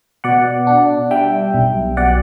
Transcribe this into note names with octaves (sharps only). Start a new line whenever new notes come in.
B2 D5 F#5
D4
G3 E5 G5
B1
B2 D5 F#5